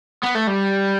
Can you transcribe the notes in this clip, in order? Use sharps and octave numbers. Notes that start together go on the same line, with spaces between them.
B3
A3
G3